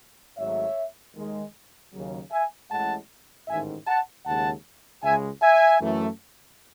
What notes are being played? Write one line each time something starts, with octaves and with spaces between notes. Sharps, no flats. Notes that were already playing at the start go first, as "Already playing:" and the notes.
G#1 G#2 F#3 A3 C#5 E5
D#2 D#3 G#3
D#2 C#3 F#3
E5 G#5
A1 A2 G#3 F#5 A5
A1 G#2 D#3 E5 G#5
F#5 A5
D#2 C#3 G#3 F#5 A5
C#2 C#3 G#3 E5 G#5
E5 G#5
F#2 E3 A3